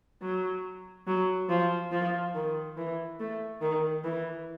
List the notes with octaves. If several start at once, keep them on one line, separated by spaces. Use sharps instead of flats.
F#3
F#3
F3
F3
D#3
E3
A3
D#3
E3